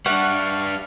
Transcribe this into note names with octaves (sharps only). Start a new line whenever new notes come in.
G3 D4 E5 F#5 C#6 F6